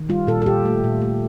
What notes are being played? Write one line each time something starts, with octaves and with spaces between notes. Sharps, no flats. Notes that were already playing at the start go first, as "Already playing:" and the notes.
Already playing: D#3
G3 F4
A#2 A4
A4
A#2 G4
A3
A#2
A3